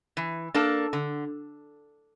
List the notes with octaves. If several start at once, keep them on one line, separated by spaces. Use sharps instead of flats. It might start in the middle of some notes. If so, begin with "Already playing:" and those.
E3
A#3 D4 A4
D3